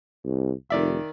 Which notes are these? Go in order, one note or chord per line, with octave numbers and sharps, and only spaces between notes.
C2
F1 D#3 D5 E5